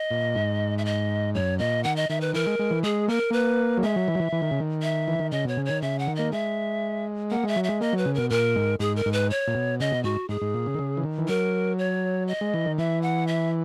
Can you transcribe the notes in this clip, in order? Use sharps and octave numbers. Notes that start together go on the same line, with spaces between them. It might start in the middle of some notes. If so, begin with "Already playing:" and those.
Already playing: D#5
A#2
G#2
E5
D#5
F#2 C#5
A#2 D#5
D#3 F#5
D#5
D#3 E5
B4
E3 A#4
G#3
G#3
E3
G#3 G#4
A#3 A#4
A#3 B4
F#3
G#3 E5
F#3
E3
F#3
E3
E3
D#3
C#3
D#3
E5
E3
D#3
C#3 D#5
B2 C#5
C#3
D#3 C#5
C#3 E5
F#5
D#3
A#3 D#5
G#3 E5
A#3 F#5
G#3 E5
F#3
G#3 E5
A#3 D#5
F#3 B4
C#3
B2 A#4
A#2 A#4
G#2
G#2 G#4
A#4
G#2
B4
C#5
A#2
B2
C#3 D#5
B2
G#2 F#4
G#2 G#4
G#2
A#2
C#3
D#3
C#3
E3
D#3
E3
F#3 A#4
C#5
D#5
G#3
E3
D#3
E3 E5
F#5
E5